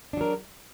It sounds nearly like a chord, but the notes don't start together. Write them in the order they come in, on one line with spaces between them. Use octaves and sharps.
D4 F#3 A#4